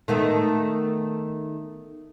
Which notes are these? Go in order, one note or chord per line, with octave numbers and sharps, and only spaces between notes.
D#3 A3 B3